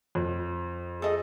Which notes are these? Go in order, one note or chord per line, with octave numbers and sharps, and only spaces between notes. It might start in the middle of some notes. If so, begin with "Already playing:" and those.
F2
G#4 A4 D#5